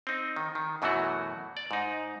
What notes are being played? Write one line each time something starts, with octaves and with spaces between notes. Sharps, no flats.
C4 D#4
D#3
D#3
F#2 B2 E3 F#3 A3 F#4
D5
G#2 D#4